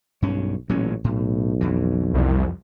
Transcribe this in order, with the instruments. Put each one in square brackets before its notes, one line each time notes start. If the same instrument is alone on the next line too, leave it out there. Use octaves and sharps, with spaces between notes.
[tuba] B1 [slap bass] G2 C#4
[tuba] A1 [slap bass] A#2 F#3 C#4
[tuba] B1 [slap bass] A2
[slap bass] F2 E3
[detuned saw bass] C2